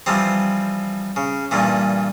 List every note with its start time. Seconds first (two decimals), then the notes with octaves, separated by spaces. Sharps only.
0.06 E3 F3 G3 C4
1.16 C#3
1.51 G2 A#2 E3